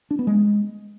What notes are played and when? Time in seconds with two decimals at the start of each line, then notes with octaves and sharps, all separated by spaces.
0.11 D4
0.19 B3
0.27 G#3